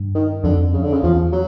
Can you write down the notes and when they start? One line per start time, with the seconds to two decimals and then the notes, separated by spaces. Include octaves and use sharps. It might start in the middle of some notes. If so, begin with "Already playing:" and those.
Already playing: G2
0.15 D#3
0.44 F2 D3
0.73 C#3
0.83 D3
0.93 C#3
1.03 E2 F3
1.32 F#3